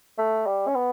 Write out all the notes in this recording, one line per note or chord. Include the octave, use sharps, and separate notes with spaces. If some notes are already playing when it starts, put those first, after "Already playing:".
A3
G3
C#4
B3